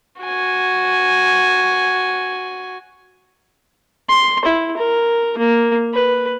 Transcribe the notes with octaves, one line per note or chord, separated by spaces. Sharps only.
F#4 G#5
C6
E4
A#4
A#3
B4